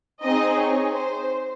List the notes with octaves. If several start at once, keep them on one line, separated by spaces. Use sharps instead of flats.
C4 D#4 G#4 D#5
C#5
C5